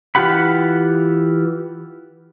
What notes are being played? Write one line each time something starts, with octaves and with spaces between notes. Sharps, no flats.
E3 F4 G4 F#5 B5